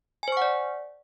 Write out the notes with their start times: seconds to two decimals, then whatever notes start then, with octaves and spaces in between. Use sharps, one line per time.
0.23 G#5
0.28 C5
0.32 C#6
0.37 F#5
0.42 D5